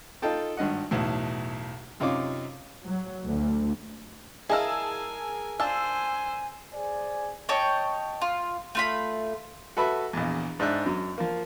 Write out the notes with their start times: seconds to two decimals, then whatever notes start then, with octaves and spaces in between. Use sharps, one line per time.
0.22 D#4 F4 A4 G5 A5
0.57 G#1 G2 D#5 F#5
0.91 B1 E2 A2
2.00 F#2 C3 D#4 F4 C#5 D6
2.86 F#3
3.25 D2
4.49 E4 G#4 A#4 D#5 F5 G#5 A5 E6
5.60 D4 F4 C5 G#5 A5 E6
6.74 G#4 C5 D5 G#5
7.49 C#5 D#5 G5 A5
8.21 F4
8.75 A3 F4 B5
9.77 F#4 A4 B4 E5
10.13 A#1 E2
10.60 G#2 D4 E5 F#6
10.86 F#2
11.18 F3 A#3